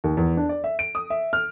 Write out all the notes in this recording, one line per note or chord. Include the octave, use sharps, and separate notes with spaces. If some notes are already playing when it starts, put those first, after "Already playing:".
D#2
E2
D4
D5
E5
D7
D#6
E5
F6